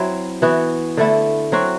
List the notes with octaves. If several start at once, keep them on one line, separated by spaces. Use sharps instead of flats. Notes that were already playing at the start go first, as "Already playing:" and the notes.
Already playing: F#3 C4 E4
E3 B3 F#4
D3 A3 E4
F#3 C4 F#4